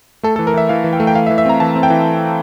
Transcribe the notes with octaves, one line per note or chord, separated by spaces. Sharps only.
A3 A4
E3 A4
A#4
E3 E5
E3 F5
E3
G5
A3
G5
E3 F5
E5
E3
E5
C4 A#5
E3 A5
C4
G5
E3